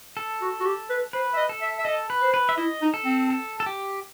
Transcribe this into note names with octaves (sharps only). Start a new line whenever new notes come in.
A4
F#4
F#4
G4
B4
B4 C5
E5
D#5
A4
E5
E5
A4 D#5
B4
C5
B4
E5
E4 D#5
D#4
A4
C4
A4
A4
G4